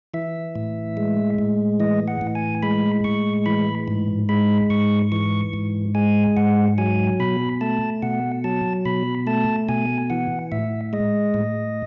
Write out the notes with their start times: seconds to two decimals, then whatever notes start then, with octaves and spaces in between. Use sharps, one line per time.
0.14 E3 E5
0.56 A2
0.97 G#3
1.39 A2
1.80 E3 D#5
2.08 F#5
2.21 A2
2.35 G#5
2.63 G#3 B5
3.04 A2 C#6
3.46 E3 B5
3.88 G#2
4.29 G#3 B5
4.70 G#2 C#6
5.12 E3 C#6
5.53 G#2
5.95 G#3 G#5
6.37 G#2 F#5
6.78 F#3 G#5
7.20 B2 B5
7.61 A3 A5
8.02 B2 F#5
8.44 F#3 A5
8.85 B2 B5
9.27 A3 A5
9.69 B2 G#5
10.10 E3 F#5
10.52 A2 E5
10.93 G#3 D#5
11.34 A2